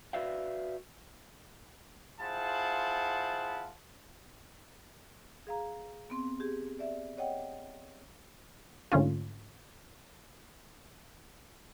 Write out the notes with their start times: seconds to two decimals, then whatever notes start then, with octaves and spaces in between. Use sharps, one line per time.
0.13 F#4 B4 D5 E5 F5 G5
2.20 E4 F4 G#4 C5 F#5 A5
5.47 G#4 F5 A#5
6.10 B3 C4 C6
6.40 G4 G#4
6.79 D5 E5
7.18 C#5 D#5 F#5 G5
8.92 G#2 D3 A3 C#4 F4